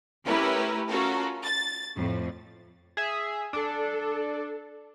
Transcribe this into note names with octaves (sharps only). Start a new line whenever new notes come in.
A3 C#4 E4 G4 A#4 B4
C#4 F4 F#4 A4 A#4
A6
F2 A2
G#4 E5
D4 A4